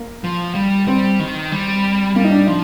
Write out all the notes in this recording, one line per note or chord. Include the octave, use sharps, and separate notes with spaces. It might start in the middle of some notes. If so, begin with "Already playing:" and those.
Already playing: A#3
F3
G3
G3 C4
D#3
G3
G3 A#3
D#4
D4
F3 D#4